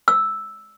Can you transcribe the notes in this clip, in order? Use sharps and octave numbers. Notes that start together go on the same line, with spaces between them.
E6